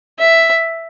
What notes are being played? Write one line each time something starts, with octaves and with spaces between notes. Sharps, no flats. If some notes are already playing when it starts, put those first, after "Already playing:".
E5